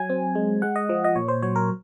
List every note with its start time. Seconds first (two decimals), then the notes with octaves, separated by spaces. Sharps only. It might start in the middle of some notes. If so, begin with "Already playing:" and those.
Already playing: F#3 G#5
0.10 C4
0.35 G#3
0.62 G#3 F#5
0.76 D#5
0.89 F3
1.04 D#5
1.16 A#2 C#5
1.28 C5
1.42 F#3 C#5
1.56 A#4